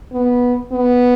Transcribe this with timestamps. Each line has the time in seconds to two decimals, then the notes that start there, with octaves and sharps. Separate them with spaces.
0.13 B3
0.72 B3